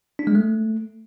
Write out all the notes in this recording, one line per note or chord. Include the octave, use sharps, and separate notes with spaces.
D4
G#3
A3